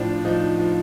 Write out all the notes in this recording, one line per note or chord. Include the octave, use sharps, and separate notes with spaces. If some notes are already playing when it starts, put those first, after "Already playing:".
Already playing: A2 F3 D4
F3 D#4
F3